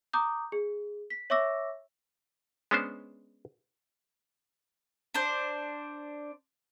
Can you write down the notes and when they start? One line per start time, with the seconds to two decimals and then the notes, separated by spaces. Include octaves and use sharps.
0.13 A#5 D6 D#6 G6
0.52 G#4
1.10 B6
1.30 C#5 E5 C#6 D6 E6 A#6
2.71 G#3 B3 C#4 D4 C5
5.14 D4 C5